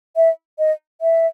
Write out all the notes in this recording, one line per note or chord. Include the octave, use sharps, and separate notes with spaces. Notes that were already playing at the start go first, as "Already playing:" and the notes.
E5
D#5
E5